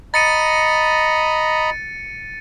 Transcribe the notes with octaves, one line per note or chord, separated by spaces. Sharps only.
D#5 A#5 B5 A6 C#7 D#7